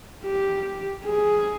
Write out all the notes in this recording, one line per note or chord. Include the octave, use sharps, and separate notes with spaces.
G4
G#4